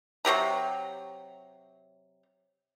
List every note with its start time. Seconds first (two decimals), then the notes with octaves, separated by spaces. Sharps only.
0.25 C3 F#3 G4 A#5